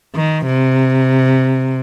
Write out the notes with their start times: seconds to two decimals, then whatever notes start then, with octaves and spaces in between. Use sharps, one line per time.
0.15 D#3
0.46 C3